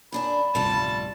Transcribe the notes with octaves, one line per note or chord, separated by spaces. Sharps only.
F#2 D4 A5 B5
D1 G1 C3 F3 G3 A3 A5